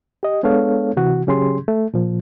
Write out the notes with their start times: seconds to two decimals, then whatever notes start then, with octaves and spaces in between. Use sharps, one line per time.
0.23 G4 D#5
0.43 G#3 B3 D4 A4 C#5 F5
0.97 C3 E3 F#4
1.27 C#3 F#3 C#4 G4 G#4 C6
1.68 A3
1.94 A#2 F3